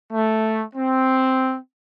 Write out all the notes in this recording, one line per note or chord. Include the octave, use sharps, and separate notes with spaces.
A3
C4